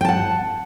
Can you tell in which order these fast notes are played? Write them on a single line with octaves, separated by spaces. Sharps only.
G5 A5 F#5